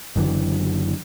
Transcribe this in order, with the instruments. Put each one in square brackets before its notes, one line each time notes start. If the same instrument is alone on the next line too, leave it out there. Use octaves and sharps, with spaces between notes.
[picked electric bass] F#1 F#2 D3 E3